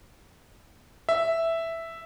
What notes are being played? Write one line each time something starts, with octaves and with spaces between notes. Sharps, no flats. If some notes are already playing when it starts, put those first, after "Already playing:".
E5